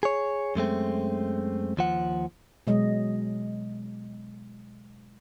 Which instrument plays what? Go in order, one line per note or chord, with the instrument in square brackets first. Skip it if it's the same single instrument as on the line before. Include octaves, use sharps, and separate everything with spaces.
[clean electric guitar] G#4 C#5
F#2 G#3 A3 C4
D#2 F3 F#5
[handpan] B2 F#3 G#3 D#5